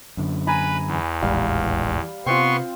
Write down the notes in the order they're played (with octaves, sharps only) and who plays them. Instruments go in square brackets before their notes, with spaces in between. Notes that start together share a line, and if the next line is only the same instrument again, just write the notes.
[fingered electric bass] F#2 D3
[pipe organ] B4 [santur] G#5 A#5 B5
[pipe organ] E2
[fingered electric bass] D#1 A1 G#3 [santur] G3 F5
[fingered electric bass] C3 [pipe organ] B3 C6 C#6 [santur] C4 F4